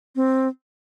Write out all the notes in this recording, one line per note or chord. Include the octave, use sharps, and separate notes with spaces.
C4